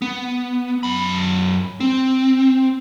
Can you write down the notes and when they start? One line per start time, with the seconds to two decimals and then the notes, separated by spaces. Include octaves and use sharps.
0.02 B3
0.83 F#2 B5
1.80 C4